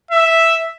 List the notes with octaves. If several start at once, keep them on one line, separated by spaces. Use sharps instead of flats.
E5